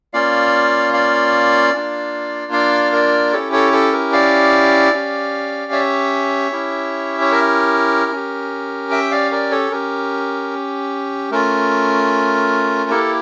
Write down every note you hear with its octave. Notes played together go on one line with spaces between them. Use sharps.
A#3 C#4 F4 D5 F5
D5 F5
A#3 D4 F4
D5 F5
A#4 D5
C#4 E4 G4 A4 C#5
A4 C#5
A4
A#4
D5 F5
C#4 G4
C#5 E5
C#4 E4 G4
C#5
A#4
C#4 G4
E5 G5
D5 F5
A#4 D5
A4 C#5
C#4 G4 A#4
A3 C#4 F4 A#4
A#3 E4 G4 A4